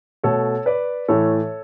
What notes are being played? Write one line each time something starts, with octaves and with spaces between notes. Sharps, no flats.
B2 A3 A4 C#5
B4 D5
A2 E3 A3 A4 C#5